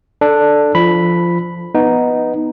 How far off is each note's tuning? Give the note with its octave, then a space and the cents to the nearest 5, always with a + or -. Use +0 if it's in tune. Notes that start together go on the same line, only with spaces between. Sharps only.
D4 +5 A4 +5
F3 -15 B5 +0
B3 +0 D#4 +0